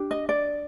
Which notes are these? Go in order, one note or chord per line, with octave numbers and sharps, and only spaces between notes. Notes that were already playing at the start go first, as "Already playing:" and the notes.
Already playing: D4 G4
D#5
D5